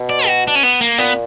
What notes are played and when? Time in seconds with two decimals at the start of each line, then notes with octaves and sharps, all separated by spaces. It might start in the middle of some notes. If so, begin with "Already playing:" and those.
Already playing: B2
0.09 D5
0.27 F#4
0.48 D4
0.55 C#4
0.63 B3
0.81 A#3
0.98 A#2 B3